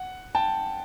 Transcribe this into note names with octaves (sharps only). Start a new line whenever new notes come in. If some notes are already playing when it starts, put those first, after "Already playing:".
Already playing: F#5
G5 A5